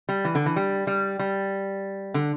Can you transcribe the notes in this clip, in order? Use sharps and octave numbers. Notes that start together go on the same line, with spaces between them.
G3
E3
D3
E3
G3
G3
G3
D3